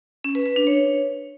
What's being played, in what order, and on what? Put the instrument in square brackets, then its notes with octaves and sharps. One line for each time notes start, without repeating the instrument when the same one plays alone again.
[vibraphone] C#4
B4
B4
D4
C#5